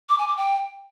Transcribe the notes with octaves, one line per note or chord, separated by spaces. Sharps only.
D6
G#5
D6
G5